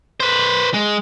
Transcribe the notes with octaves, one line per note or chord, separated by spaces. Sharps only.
B4 C5
G#3